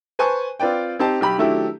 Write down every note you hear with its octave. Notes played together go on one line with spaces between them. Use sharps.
B4 C5 G#5 A5 C#6
C4 F4 B4 D5 G5
C4 D#4 G4 A5
B1 G4 B5
D#3 F#3 A3 D4 E4 G4